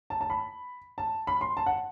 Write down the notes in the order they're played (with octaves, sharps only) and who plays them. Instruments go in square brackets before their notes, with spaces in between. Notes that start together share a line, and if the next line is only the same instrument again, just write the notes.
[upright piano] A5
A5
B5
A5
B5
C6
A5
F#5